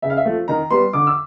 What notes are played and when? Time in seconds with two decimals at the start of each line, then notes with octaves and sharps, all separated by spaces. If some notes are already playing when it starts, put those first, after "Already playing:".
0.02 C#3 E5
0.10 F5
0.17 E5
0.25 F3 A3
0.48 D#3 A#5
0.70 G3 B3 C6
0.93 D3 D6
1.07 E6